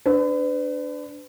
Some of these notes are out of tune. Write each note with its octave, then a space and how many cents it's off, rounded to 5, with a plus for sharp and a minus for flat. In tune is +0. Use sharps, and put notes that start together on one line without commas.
D4 +0 B4 +40